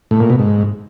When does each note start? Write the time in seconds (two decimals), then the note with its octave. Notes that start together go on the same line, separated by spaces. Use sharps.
0.11 A2
0.20 A#2
0.30 B2
0.39 G#2